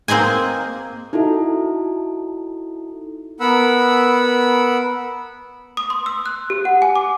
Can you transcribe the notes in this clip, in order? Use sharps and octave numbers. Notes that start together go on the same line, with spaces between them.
A#3 C4 G#4 D#5 G#5
D#4 E4 F#4 A4 E5
B3 A#4 F#5 B5 E6
D#6
C6
E6
F#6
G4
F#5
G#5
D6